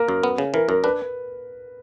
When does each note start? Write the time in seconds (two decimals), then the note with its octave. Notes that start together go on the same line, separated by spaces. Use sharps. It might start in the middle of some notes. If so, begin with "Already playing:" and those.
Already playing: A#3 A#4
0.08 F#2
0.23 B3
0.38 C#3
0.54 E3 A#4
0.69 F#2 A#4
0.84 D4 B4